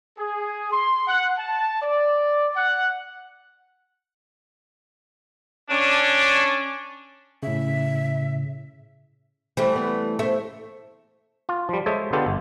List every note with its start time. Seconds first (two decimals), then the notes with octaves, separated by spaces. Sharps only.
0.18 G#4
0.71 C6
1.07 F#5
1.38 A5
1.81 D5
2.56 F#5
5.70 C#4 D4
7.43 A2 C#3 E5
9.57 E3 G3 A3 C5
9.76 B3
10.19 A3 C5 E5
11.49 F4
11.69 F3 G3
11.86 G#3 G#4 A4 C5 C#5 E5
12.13 D3 B3 F4 G4 A4
12.26 G1